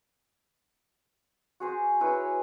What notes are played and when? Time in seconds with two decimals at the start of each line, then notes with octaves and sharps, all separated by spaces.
1.60 F#4 G#4 C5
2.00 E4 G#4 B4 C#5